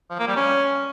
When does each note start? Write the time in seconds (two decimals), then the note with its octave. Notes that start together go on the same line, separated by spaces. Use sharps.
0.10 F3
0.19 A#3
0.28 G3
0.36 C#4